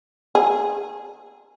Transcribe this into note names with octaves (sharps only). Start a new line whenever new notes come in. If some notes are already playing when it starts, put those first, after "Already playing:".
G#4